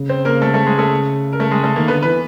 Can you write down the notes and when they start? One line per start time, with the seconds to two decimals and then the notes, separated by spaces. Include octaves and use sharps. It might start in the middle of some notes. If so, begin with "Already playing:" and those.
Already playing: C#3
0.09 C4 C5
0.25 A#3 A#4
0.42 A3 A4
0.54 A3 A4
0.66 G#3 G#4
0.78 A3 A4
1.33 A#4
1.40 A3 A4
1.51 G#3 G#4
1.64 A3 A4
1.76 D#3 A#3 A#4
1.88 D3 B3 B4
2.03 E3 B4